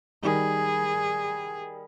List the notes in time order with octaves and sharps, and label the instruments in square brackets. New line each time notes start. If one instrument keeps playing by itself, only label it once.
[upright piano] D#3 G3 [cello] G#4